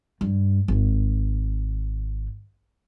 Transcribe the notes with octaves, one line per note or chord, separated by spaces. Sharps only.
G2
G#1